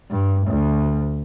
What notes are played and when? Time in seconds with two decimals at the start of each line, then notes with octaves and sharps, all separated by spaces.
0.10 G2
0.48 D2